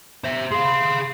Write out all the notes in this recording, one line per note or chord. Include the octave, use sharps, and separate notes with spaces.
C5 E5
G#4 F5 C6